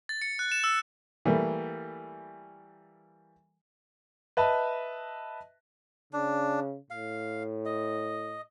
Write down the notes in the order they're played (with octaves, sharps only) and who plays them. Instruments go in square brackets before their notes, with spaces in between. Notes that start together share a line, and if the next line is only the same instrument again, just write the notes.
[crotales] A6
C#7
F#6
E7
E6
[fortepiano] E3 G3 A3 A#3
[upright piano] B4 D#5 E5 A5
[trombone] C#3 [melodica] D4
[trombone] A2 [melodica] F5
[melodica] D#5